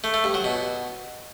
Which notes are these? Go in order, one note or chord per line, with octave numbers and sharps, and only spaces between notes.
A3
A3
G2
F#3
B2